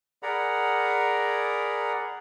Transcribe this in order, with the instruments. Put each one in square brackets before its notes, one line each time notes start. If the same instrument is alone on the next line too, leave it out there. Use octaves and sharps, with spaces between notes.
[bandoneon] G#4 A#4 D5 F#5 A#5 B5